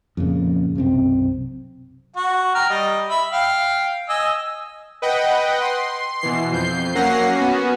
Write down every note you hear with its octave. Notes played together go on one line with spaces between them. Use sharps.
F2 A#2 C#3
B1 F#2 C3 C4
F#4 F#5
G5 A#5 F6
G3 D#5
E5 B5
F5 G5
D#5 G#5 E6
B4 D#5 F#5 G5
C6
B2 E3 C7
F2 G6 C7
F#3 A#3 C#4 F#5 A#6 C7
B3 C#4 F#4